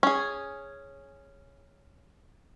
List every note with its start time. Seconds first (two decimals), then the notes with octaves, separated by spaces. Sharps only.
0.03 C#4 G#4